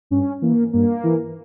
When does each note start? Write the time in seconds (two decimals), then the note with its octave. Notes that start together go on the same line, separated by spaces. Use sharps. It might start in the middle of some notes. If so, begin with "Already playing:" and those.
0.11 G2 C#4
0.42 E3 A#3
0.73 G2 A#3
1.04 E3